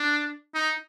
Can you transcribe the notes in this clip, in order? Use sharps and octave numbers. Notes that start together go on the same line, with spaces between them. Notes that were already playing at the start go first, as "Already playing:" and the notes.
Already playing: D4
D#4